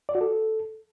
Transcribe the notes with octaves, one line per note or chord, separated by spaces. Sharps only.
D5
F#4
A4